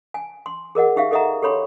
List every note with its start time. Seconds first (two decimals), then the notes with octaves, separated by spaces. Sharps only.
0.14 G#5
0.46 C6
0.75 G#4 A#4 D#5 F#5
0.96 D#4 G4 E5 F5
1.11 G4 A4 D#5 E5 F#5 A#5
1.42 G4 A4 C#5 B5 C6